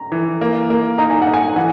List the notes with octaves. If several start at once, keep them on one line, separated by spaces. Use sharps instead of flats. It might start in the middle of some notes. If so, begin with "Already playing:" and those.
Already playing: A#5
E3
A#3
A#3
D#4 A#5
G#5
F#5
D#4
G#5
E3 F#5